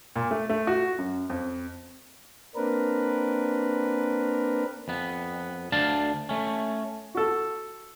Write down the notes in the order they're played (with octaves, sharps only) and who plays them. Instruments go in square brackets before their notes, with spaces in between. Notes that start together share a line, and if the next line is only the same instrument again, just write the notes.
[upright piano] A#2
A3
A3
F#4
F#2
F2
[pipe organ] A#3 C4 D4 A#4 B4
[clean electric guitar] F2 B3
D2 D4 F5 A5
A3 C#4
[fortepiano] F#4 A4